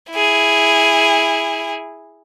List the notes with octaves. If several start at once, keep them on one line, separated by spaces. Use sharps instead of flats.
E4 G#4